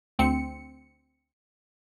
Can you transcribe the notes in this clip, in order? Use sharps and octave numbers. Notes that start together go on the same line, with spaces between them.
D2 C4 C#7